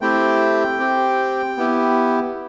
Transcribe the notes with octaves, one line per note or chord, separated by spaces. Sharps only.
A3 C4 E4 G4 G5
C4 G4
B3 E4 G4